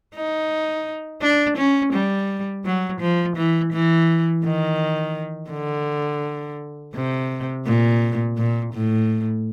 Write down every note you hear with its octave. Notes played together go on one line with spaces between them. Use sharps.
D#4
D4
C#4
G3
F#3
F3
E3
E3
D#3
D3
C3
A#2
A#2
A2